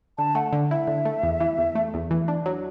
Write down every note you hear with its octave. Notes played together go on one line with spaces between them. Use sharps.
D3 A5
A3 F#5
D3
E4 E5
D3
A3
E2
E3
E2
A3
E2
E3
D4
F#3